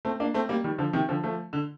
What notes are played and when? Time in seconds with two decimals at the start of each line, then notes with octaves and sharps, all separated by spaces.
0.05 A3 C4
0.20 A#3 D4
0.34 A3 C4
0.49 G3 A#3
0.64 D#3 G3
0.78 D3 F3
0.93 C3 D#3
1.09 D3 F3
1.23 F3 A3
1.53 D3